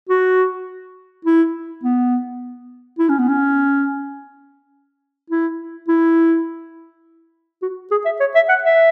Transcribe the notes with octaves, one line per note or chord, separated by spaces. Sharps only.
F#4
E4
B3
E4
C#4
B3
C#4
E4
E4
F#4
G#4
E5
C#5
E5
F#5
E5